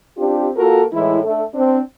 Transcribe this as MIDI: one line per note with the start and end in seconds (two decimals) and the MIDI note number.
0.18 0.49 60
0.18 0.49 62
0.18 0.49 65
0.18 0.49 67
0.57 0.83 58
0.57 0.83 65
0.57 0.83 66
0.57 0.83 69
0.57 0.83 70
0.93 1.20 45
0.93 1.20 52
0.93 1.20 56
0.93 1.20 64
1.24 1.43 57
1.24 1.43 62
1.24 1.43 69
1.54 1.79 60
1.54 1.79 62